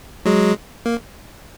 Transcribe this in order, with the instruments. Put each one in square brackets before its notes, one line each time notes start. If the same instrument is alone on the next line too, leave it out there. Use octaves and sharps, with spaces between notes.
[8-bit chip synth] F#3 G#3
A#3